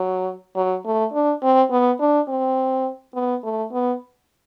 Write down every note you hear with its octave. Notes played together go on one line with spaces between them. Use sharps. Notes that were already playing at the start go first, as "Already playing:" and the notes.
Already playing: F#3
F#3
A3
D4
C4
B3
D4
C4
B3
A3
B3